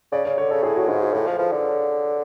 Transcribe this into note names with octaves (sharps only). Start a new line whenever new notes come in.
C#3 D5
C#3 C#5
D3 C#5
C#3 A4
A2 G#4
F#4
G#2 F4
F#4
A2 G#4
F3 A4
F3 B4
D3 D5
C#5